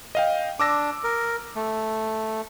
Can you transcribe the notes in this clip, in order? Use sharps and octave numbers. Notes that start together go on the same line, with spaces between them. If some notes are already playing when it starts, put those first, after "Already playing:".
D#5 F5 G5
D4 D6 E6 A#6
A#4
A3